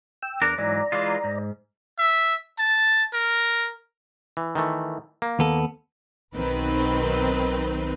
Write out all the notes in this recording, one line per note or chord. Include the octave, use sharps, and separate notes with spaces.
G5 E6
E2 D4 A#4
G#2 E3 F#3 D5 A#5
E3 G#3 F4
G#2
E5
A5
A#4
E3
D#3 E3 A3
A#3
D#2 B3 A4
B1 D#3 C4 B4